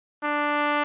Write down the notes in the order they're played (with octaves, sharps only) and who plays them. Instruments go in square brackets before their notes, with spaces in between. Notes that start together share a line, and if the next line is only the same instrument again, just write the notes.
[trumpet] D4